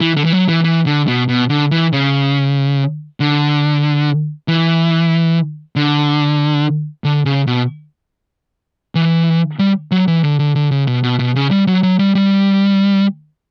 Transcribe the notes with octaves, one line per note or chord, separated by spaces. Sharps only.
E3
D3
E3
F#3
E3
E3
D3
B2
B2
D3
E3
C#3
D3
E3
D3
D3
C#3
B2
E3
G3
F#3
E3
D3
D3
D3
C#3
B2
B2
B2
C#3
G3
F#3
F#3
G3
G3